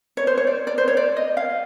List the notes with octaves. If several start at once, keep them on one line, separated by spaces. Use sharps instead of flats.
C#5
C5
C#5
D5
D5
C5
C#5
D5
D#5
F5